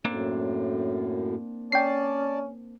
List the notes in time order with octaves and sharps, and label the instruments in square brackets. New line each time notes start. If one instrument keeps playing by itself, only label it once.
[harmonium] F#2 A2 [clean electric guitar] A#3 C4 D4
[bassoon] C#4 [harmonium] D5 A5 [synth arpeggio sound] G5 C7